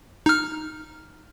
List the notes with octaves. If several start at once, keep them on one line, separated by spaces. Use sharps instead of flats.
D#4 F6